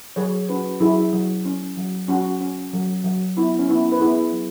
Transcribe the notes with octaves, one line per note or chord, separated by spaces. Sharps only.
F#3 G#4 C#5
C#4 F#4 B4
F#3 E4 G#4
F#3
C#4
F#3
F#3 C#4 F#4
C#4
F#3
F#3
B3 E4
C#4
B3 E4
B4
B3 E4 G#4
F#3